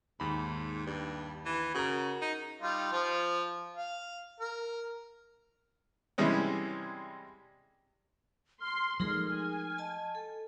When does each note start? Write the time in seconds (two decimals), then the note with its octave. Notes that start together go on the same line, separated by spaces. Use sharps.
0.20 D#2 G#2 B5
0.86 G2
1.45 E3
1.74 C#3 F#4 A#4 A#5
2.21 D#4
2.62 G3 D#4 F4
2.92 F3 F4 C5
3.76 F5
4.40 A#4
6.18 C3 E3 G3 G#3 C#4
8.61 C6 F6
9.00 F3 G#3 A3 D#4 G#4 A#4 C6
9.31 G#5
9.78 D#5 A5
10.15 A4